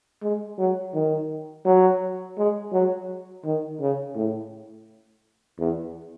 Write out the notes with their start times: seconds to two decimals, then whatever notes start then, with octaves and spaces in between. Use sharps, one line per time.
0.22 G#3
0.58 F#3
0.94 D#3
1.65 F#3
2.38 G#3
2.73 F#3
3.45 D#3
3.80 C#3
4.15 A2
5.59 E2